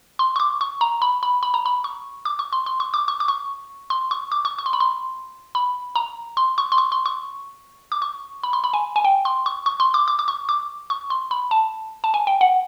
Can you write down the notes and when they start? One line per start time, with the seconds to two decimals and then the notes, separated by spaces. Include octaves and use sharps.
0.19 C6
0.36 C#6
0.40 D6
0.61 C#6
0.81 A#5
1.02 B5
1.23 B5
1.43 B5
1.54 A#5
1.66 B5
1.84 C#6
2.25 D6
2.39 C#6
2.53 C6
2.66 C6
2.80 C#6
2.94 D6
3.08 C#6
3.20 D6
3.28 C#6
3.90 C6
4.11 C#6
4.32 D6
4.45 C#6
4.58 C#6
4.66 C6
4.73 B5
4.80 C6
5.55 B5
5.96 A#5
6.37 C6
6.58 C#6
6.72 C6
6.78 C#6
6.92 C6
7.06 C#6
7.92 D6
8.02 C#6
8.43 B5
8.53 C6
8.64 B5
8.74 G#5
8.96 G#5
9.04 G5
9.25 C6
9.46 C#6
9.66 C#6
9.80 C6
9.94 D6
10.08 D6
10.19 D6
10.28 C#6
10.49 D6
10.90 C#6
11.10 C6
11.31 B5
11.51 A5
12.04 A5
12.14 G#5
12.27 G5
12.41 F#5